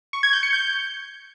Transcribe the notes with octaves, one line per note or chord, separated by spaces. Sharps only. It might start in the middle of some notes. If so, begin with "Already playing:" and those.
C#6
G#6
G6
C#7
G6